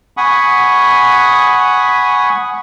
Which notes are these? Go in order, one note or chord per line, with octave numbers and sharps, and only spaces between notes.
F#5 G#5 B5 C#6 D#6